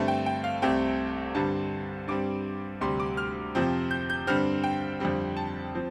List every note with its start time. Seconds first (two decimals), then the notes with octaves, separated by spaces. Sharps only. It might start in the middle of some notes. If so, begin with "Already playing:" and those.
Already playing: G2 D3 A3 C4 A5
0.08 G5
0.26 G5
0.44 F5
0.62 C2 C3 A3 C4 G5
1.35 G2 D3 G3 C4 A5
2.08 G2 G3 C4 D6
2.81 D2 C3 G3 C6
3.00 D6
3.17 F6
3.55 F2 C3 F3 C4
3.91 G6
4.10 G6
4.27 G2 D3 G3 C4 F6
4.64 G5
5.00 F2 D3 G3 C4
5.37 A5
5.75 F3 C4